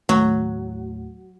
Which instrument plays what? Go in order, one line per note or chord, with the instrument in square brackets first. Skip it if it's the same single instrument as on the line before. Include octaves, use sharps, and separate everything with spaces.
[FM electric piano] D#2 A2 [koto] F#3